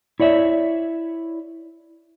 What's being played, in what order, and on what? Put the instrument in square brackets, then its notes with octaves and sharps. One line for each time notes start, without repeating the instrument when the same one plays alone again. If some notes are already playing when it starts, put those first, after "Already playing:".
[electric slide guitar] E4 C#5 D5 E5